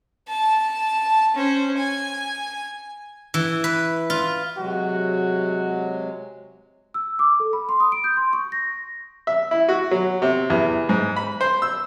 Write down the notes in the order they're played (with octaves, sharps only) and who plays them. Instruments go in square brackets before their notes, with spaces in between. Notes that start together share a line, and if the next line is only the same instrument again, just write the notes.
[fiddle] A5
C#4 C5
G#5
[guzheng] E3
B4
F4
[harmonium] C3 F#3 G#3 [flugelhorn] F#4
[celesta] E6
D6
A4
B5
C6
D#6
D7
G6
C6
C#6
A#6
[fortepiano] E5
E4
F#4
F#3
C3
E2
G#2
B5
C5
E6